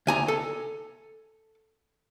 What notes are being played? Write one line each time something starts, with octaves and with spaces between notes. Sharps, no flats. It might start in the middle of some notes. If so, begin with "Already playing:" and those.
D2 G#5 A#5
A4